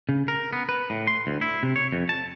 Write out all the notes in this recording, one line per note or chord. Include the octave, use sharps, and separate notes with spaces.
C#3
A#4
B3
B4
A2
C6
D2
E4
C3
C#5
F2
A5